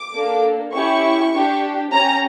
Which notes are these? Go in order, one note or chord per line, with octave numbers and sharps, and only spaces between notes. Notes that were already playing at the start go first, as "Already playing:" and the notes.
Already playing: D6
A#3 D4 A4
C#4 E4 G4 C#6
D4 G4
C#4 G4 A#5